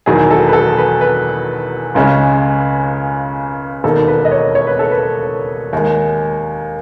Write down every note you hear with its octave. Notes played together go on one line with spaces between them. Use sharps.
E1 E2 D#3 F#3 G#4
A4
B4
A4
B4
B4
C#2 C#3 G#3 C#4
E1 D#2 D#3 A4
B4
D#5
C#5
C#5
B4
A4
B4
D#2 D#3 G#3